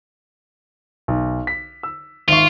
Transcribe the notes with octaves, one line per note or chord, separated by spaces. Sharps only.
B1
B6
E6
G#1 F4 E5 C#6